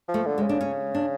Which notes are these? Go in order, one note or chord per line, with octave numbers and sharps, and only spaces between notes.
F3
A3
D3
G#3
C#3
D4
C#4
D4